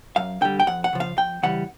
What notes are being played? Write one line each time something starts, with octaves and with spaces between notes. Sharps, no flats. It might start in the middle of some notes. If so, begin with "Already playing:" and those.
F#2 F5
D3 G3 G5
G5
F2 F#5
F#5
C#3 F3
F5
F2 G5
C#3 E3 G3 F#5